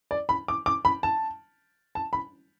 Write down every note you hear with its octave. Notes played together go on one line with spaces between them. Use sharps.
D5
B5
D6
D6
B5
A5
A5
B5